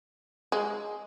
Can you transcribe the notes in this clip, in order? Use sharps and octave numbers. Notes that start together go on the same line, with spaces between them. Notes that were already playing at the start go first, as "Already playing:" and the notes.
G#3